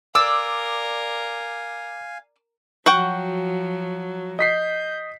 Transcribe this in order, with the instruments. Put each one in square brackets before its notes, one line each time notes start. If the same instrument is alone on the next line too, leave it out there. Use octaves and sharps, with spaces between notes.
[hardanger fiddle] A#4 [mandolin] D5 E6 [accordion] F5 G#5 [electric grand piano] D6
[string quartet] F3 F#3 [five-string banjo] F#4 F#5 G5
[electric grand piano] D#5 B6 C7 [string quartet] G6